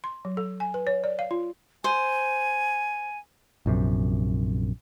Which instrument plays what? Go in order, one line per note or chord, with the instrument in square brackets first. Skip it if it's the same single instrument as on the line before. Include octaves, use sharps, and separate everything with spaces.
[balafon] C6
F#3
A4
G#5
B4
C#5
D5
F5
F4
[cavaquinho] C5 [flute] G#5
[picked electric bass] A#1 F#2 C3